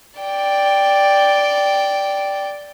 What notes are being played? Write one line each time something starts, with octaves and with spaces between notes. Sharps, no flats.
D5 G5